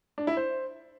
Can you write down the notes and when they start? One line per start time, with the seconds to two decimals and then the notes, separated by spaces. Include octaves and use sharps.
0.18 D4
0.27 E4
0.37 C5